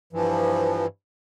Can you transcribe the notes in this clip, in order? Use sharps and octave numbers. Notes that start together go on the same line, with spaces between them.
G2 E3 F3